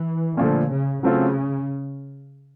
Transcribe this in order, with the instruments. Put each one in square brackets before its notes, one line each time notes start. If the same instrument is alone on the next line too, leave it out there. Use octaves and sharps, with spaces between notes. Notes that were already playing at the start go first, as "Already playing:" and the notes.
Already playing: [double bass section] E3
[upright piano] A#2 F3 A3 [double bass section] D3
[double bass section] C#3
[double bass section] C#3 [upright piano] F#3 A3 C4 F4 A4